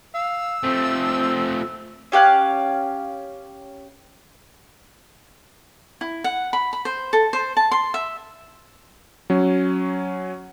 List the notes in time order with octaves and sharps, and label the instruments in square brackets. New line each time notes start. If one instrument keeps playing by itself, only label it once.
[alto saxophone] F5 [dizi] E6
[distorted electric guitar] F3 A3 [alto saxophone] C4
[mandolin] C#4 G4 F5 F#6
[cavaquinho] E4
F#5
B5
B5
C5
A4
C5
A5
C6
E5
[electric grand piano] F#3 C#4